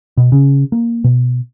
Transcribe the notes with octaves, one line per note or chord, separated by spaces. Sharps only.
B2
C#3
A#3
B2